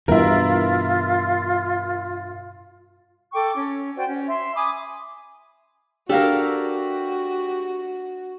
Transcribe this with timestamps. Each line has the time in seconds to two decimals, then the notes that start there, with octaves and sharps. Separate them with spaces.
0.08 G2 B2 E3 E4 F4 A#4
3.32 A4 G5 C#6 D6
3.55 C#4
3.96 F#4 C5 D5 G5
4.08 C#4
4.28 E5 C6
4.55 G#5 B5 D6 D#6
6.09 D4 F#4 G4 A4 A#4 F5